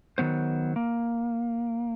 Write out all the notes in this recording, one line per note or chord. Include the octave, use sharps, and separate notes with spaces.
D#3 F#3 B3 C5
A#3